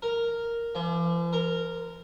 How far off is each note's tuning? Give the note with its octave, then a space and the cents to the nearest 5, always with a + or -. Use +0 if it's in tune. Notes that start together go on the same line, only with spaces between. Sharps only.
A#4 -5
F3 -45
A#4 -15